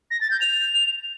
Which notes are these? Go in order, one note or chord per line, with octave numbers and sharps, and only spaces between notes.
A#6
A6
G6
F7